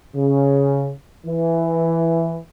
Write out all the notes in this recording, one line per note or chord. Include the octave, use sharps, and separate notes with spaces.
C#3
E3